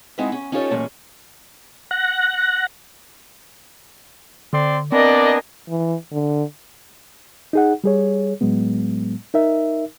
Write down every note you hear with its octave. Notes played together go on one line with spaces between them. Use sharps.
G#3 C4 D#4 E4 F#4 E5
C#4
C#4 D#4 F4 G4 A4 C#5
A#2 E3 F#3 G#3 A3 C#4
F#5 F#6 A#6
D3 C4 D5 C6
B3 C4 D4 A#4 D5 D#5 G#5
E3
D3
D#4 G#4 F#5
G3 G#4 C#5
A2 F#3 G#3 B3
D#4 A#4 E5